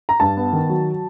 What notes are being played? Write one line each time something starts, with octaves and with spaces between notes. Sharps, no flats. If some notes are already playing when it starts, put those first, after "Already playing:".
A#5
G2 A5
B3
D#3
F#3